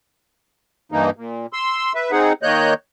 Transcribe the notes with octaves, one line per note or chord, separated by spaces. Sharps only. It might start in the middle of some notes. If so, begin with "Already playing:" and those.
G2 E3 A#3 D#4
A#2
C6 E6
B4 E5
C4 D#4 G#4 F#5
D#3 A#3 C#5 D#5 F#6 G6